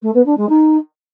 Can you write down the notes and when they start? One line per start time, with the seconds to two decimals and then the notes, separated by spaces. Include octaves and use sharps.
0.02 A3
0.14 B3
0.26 D4
0.37 G#3
0.49 D#4